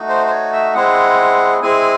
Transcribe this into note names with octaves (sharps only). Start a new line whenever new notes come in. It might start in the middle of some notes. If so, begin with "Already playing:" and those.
Already playing: A3 D#4 F#4
C5
C5
C#5
E5
G#3 C4 E4 G#4 F#5
G#3 C4 E4 G#4 G#5